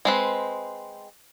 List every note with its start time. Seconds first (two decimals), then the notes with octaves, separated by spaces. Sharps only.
0.05 G#3 C4 B4